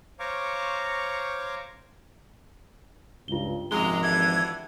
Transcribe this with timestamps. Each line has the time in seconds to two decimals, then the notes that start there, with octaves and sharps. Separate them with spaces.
0.20 C5 C#5 F5 A#5 C#6 D6
3.28 C#2 G2 F4 G7
3.71 G#1 F#2 C3 F3 G#3 A#5 G7
4.02 G2 D3 E3 G#6